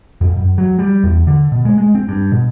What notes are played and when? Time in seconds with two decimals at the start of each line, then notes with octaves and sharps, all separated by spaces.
0.21 F2
0.37 F#2
0.58 F#3
0.79 G3
1.04 E2
1.27 D3
1.52 B2
1.65 G#3
1.78 G#3
1.95 C4
2.08 G2
2.32 B2